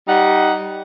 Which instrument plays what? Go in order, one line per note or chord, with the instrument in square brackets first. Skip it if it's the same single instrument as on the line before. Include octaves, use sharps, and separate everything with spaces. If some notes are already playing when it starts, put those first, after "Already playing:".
[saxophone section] G3 D#4 F#5